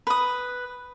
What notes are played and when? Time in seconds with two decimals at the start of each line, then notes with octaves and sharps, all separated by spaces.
0.07 B4 D#6